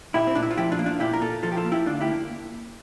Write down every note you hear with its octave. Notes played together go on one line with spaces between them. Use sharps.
A#2 E4 G4
C4
A#2 D4
E4
F4
F3 E4 G4
D4 F4
A#3
D4 F4
A#2 E4 G4
A#4
A#2 F4 A4
F3 F4 A4
G4
F4 A4
A#3
E4 G4
D2 D4 F4
E4 G4
A#3